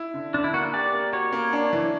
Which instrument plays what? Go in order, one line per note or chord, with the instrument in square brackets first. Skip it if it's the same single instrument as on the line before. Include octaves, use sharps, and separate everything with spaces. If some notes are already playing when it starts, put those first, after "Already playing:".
Already playing: [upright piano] E4
D3
[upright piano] D3 [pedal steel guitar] D4
[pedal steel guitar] E4
[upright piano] A#3 [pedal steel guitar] F#4
[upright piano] G4 [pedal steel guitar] D5
[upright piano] A#3
[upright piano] F#4 [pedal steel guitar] C#5
[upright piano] A#3
D4
E3